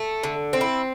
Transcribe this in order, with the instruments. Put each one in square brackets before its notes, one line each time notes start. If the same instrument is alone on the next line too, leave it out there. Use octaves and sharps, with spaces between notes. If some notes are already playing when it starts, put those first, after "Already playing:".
Already playing: [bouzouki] A3
D3
C4
E4